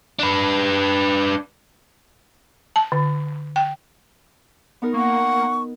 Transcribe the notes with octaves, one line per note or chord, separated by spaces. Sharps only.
D4 B4
A5
D3
G5
B3 D#4 A#4
A#3 F#5 C#6